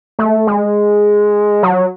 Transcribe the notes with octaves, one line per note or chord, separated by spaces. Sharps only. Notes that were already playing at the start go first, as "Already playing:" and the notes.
A3
G#3
F#3